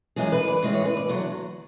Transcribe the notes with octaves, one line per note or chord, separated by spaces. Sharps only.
F#2 E3 G#3 G#4
B4
D5
A2 E3 G#3
C#5
B4
D5
E2 D3 F#3